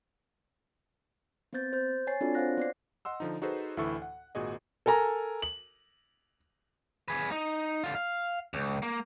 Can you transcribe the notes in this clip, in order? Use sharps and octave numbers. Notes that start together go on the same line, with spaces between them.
B3 C4 C5 G6 A6
C5 G6
C#5 G#5 A6 C7
C4 D4 F4 F#4 A4 D5
C5 C#5 F5 F#5 F#6 A#6
B3 D5 C7
D#5 F#5 C6 E6
D3 F3 D#4
D#4 F#4 G#4 A4 B4 C5
D2 A2 E3 E4 A4 C#6
F#5
G#1 A#2 F#4 G#4 D#5
A4 A#4 G#5 A#5
F#7
G#4 B4
D#4
D3 F4
F5
C#2
A#3